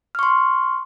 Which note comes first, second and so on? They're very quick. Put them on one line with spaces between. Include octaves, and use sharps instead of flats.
F6 C#6 C6